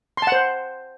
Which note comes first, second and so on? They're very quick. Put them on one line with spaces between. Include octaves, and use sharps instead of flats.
C6 A5 F#5 C5